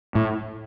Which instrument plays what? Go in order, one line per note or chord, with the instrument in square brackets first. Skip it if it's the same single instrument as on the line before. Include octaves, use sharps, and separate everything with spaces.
[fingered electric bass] A2